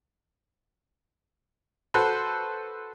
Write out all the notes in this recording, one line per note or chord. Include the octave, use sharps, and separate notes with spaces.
F#4 A4 B4 C5